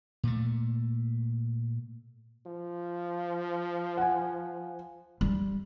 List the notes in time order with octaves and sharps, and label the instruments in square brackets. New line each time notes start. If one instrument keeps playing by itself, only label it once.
[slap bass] A#2 A3
[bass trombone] F3
[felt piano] F#5 G#5
[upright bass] G3